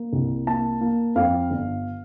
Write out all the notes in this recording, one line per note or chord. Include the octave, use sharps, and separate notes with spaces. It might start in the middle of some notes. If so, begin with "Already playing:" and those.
Already playing: A#3
C2
A#3 A5
A#3
F2 F5
G1